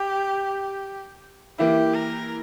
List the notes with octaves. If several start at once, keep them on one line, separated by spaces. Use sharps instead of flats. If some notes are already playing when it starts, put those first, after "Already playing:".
Already playing: G4
E3 A#3 E4 G4
A#4